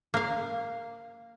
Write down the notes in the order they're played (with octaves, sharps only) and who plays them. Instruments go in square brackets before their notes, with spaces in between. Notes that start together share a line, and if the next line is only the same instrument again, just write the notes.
[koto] A#3 F5